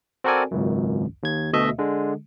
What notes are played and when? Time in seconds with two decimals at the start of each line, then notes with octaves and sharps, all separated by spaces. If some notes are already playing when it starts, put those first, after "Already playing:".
0.24 C4 F#4 A4 A#4 D5 G#5
0.51 G#1 C#2 F#2
1.23 D#2 G#6
1.53 D2 B2 A3 D#5 E5
1.78 D3 G#3